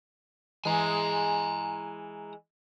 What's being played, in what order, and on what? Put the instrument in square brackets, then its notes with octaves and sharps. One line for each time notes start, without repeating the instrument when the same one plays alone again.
[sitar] E3 G#3 [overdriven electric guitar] G#5 A#5